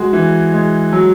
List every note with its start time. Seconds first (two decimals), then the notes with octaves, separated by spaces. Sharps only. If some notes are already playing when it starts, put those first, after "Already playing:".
Already playing: G#3 F#4
0.13 E3
0.53 G#3
0.93 F#3